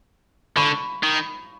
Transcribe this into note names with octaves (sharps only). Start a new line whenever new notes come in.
D3 B5 C#6
D#3